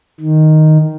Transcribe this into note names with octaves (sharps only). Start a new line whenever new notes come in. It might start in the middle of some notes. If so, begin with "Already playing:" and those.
D#3